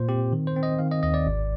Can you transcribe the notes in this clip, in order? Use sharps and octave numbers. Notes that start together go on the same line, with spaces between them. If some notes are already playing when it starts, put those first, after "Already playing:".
Already playing: A#2 C5
C4 G4
D#3
C5
C4
D#5
D#3 F5
D#5
D#2 D#5
D5
G#1